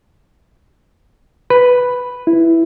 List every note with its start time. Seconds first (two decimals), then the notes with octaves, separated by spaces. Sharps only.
1.50 B4
2.27 E4